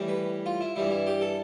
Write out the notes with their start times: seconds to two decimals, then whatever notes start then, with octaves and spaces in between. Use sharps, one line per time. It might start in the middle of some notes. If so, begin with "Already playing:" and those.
Already playing: A2 E3 G3
0.08 B4
0.46 F4
0.61 E4
0.76 G2 E3 G3 E4
0.91 E4
1.06 G4
1.21 A4